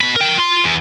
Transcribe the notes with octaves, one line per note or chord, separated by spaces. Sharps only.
B2 B5
A#4 G5
F4 C6
E2